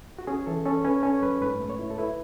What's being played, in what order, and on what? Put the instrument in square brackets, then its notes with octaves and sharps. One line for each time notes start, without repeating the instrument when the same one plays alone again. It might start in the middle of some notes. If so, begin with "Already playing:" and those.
[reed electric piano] F#4
C#4 G#4
E3 A4
C#4 A4
C#4 B4
C#4 A4
F#2 B4
G#2 B4
A3
C#5
E4
A4
E4 B4